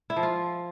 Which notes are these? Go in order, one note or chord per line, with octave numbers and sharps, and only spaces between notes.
E4
F3
F4